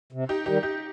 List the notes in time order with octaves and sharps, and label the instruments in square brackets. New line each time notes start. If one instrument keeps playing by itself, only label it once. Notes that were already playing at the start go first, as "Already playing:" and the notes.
[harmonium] C3
[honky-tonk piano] D#4 G4
[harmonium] D#3 G3 [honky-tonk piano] D#4 G4
[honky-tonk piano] D#4 G4